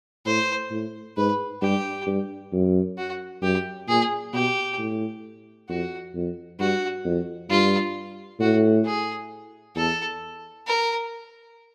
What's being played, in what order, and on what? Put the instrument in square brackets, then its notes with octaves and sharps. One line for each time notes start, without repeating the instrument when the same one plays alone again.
[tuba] A2 [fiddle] C5
[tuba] A2
[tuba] G#2 [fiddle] B4
[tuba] G2 [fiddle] G4
[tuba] G2
F#2
[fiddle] F#4
[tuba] F#2 [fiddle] G4
[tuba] A#2 [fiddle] G#4
[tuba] B2 [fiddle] G4
[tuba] A2
[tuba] F2 [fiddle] F#4
[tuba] F2
[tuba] G2 [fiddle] F#4
[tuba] F2
[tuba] G2 [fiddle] F4
[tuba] A2 [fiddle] F#4
[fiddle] G#4
[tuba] E2 [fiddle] A4
[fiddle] A#4